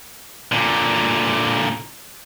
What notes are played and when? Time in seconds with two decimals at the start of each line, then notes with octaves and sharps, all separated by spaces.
0.52 A#2 D3